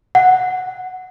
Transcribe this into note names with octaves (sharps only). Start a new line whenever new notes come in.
F#5